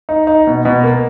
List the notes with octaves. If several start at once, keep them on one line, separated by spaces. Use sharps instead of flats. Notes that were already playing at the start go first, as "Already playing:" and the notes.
D#4
D#4
B2
B2
A#3